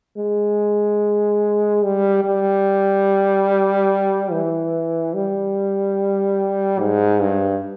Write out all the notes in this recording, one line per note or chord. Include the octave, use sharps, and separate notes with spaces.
G#3
G3
G3
E3
G3
G#2
G2